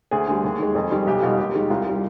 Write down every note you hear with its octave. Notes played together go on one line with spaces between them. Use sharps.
D2 G#4
D3 G3
D#2
D#3 G#3
F2
D#3 G3
B1 G4
B2 G3 F4
D#2 G4
D#3 G#3
C2 F4
C3 G3